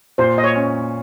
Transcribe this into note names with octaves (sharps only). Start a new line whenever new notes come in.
A#2 C5
D#5
C#5
C#4